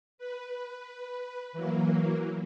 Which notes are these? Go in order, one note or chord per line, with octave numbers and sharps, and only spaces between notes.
B4
E3 F#3 A#3